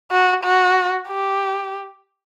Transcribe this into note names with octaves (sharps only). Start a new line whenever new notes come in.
F#4
F#4
G4